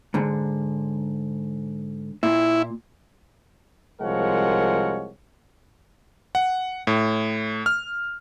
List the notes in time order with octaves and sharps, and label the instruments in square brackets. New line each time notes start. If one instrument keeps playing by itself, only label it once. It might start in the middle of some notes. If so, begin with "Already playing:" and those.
[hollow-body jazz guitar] G#2 D3
[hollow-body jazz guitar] A#2 [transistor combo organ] E4
[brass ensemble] C2 F3 G#3 A#4 C#5 F#5
[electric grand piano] F#5
A2
F6